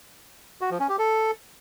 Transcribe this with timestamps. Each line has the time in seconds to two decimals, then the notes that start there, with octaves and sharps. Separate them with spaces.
0.61 F#4
0.70 F3
0.80 C#4
0.89 G4
0.99 A4